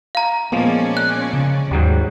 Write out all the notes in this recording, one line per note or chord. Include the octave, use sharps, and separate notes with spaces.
F5 A#5
A#2 F3 G#3 A#3 B3 C#4 D5
F#6
C#3
D#2 G#2 F#3 G3